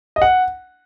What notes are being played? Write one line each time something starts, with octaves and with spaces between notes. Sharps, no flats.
D#5
F#5